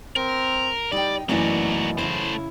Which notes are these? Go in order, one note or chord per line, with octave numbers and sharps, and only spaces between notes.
C4 A#4
G3 D#4 D5 G5
F#2 B2 E3 A3 A#3 D#4 F#4 D5
C#3 A3 E4 C5